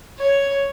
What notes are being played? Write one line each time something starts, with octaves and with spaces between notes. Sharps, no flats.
C#5